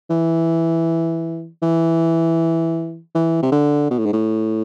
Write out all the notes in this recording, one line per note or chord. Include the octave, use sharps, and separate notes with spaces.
E3
E3
E3
C3
D3
B2
A2
G#2
A2